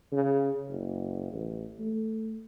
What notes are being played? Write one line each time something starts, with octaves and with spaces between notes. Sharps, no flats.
C#3
F#1
A1
A3